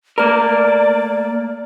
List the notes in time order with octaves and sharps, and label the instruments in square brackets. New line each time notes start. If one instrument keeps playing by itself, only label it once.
[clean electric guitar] A3 A#3 A#4 [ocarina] D5